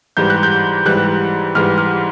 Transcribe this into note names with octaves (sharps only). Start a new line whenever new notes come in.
G#2 E3 G3 G6
F#6
G6
G#2 E3 G3 F#6
G#2 E3 G3 F6
F6